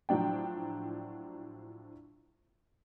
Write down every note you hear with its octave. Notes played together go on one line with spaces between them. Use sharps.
A2 F3 F#3 D4 G5